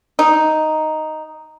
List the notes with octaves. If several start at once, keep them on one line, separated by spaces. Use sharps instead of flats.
D#4